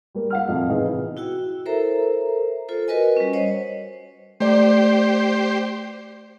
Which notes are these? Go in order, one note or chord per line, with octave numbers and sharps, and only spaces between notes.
G3 A#3
F5 F#5 F6
F2 C3
C3 E3 B3 D#4 G#4
E4 F#4 G5 E6
A4 A#4 C5 E5 A#5
F4 A4 C5
F#4 A#4 B4 D#5 G#5
G3 C#4
C5 C#5 D#5 F#5
A3 G4 C5 D5